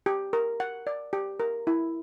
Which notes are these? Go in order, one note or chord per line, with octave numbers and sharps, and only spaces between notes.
G4
A#4
F#5
D5
G4
A#4
E4